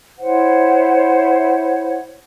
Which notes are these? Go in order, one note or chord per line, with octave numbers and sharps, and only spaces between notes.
E4 C5 C#5 F#5